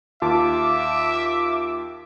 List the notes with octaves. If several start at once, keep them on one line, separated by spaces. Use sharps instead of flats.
D#2 F4 E5 A5 D6